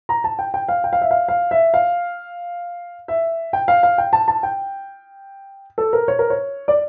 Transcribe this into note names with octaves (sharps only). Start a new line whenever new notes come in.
A#5
A5
G5
G5
F5
G5
F5
E5
F5
F5
E5
F5
E5
G5
F5
F5
G5
A5
A5
G5
A4
A#4
C#5
A#4
C#5
D5